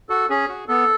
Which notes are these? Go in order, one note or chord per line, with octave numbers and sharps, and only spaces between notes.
F#4 A4
C#4 G#4
F#4
B3 A4